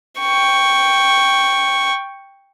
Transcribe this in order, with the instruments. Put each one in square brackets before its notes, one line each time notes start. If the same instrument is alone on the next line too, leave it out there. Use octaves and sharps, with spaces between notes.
[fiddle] G5 C#6